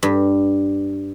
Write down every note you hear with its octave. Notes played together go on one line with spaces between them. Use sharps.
G2